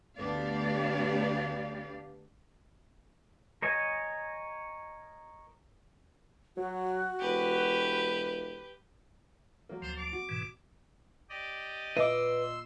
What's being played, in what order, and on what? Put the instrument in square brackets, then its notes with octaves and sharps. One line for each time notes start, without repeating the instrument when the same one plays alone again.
[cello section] D2 B3 D4 G4 D5 F5
[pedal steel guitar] A#4 C#5 D#5 G#5
[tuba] F#3 [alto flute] F#4
[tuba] E1 [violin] G4 B4
[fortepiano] F#3 A#3
[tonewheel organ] D2 F3 [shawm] C5
[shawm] D6
[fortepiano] F#4
[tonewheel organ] G#2 B2 E3
[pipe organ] G4 D5 D#5
[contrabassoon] A#2 [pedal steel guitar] B4 D6 [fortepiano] D#5 [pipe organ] C6 E6